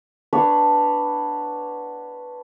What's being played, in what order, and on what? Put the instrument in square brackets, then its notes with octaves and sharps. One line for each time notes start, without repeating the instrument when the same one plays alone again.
[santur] D4 B4 C#5 F#5